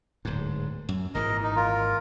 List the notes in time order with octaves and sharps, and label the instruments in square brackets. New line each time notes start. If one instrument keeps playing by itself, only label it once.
[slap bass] D1 G#2
F#2
[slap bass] G#1 A#2 E3 [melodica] A#4 D#5
[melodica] D#4
F4 A#4